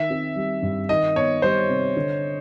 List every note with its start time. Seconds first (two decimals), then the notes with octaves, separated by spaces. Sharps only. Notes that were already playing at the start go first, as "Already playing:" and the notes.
Already playing: D#3 E5
0.10 C4
0.36 G3
0.62 G2
0.89 D#3 D#5
1.16 B3 C#5
1.42 G3 C5
1.69 C3
1.96 D3